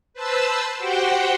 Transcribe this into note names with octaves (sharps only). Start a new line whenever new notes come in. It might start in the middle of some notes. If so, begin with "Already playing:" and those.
B4 C5 A5 E6
F#4 G4 C5 F#5 G5